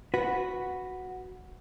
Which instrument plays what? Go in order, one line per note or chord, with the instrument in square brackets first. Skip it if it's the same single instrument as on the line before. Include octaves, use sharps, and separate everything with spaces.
[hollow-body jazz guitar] F#4 B4